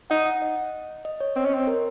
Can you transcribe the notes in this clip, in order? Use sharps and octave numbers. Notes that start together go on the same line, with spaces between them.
D#4 F#5
F#5
D#5
D#5
C#5
C4 C#5
C#4 D#5
C4
A#4